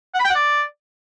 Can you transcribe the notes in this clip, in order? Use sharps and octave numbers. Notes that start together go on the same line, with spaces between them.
F#5
B5
G5
F#5
D5